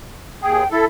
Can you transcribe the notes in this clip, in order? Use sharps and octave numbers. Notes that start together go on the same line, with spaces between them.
D#2 G#4 G5
E4 A4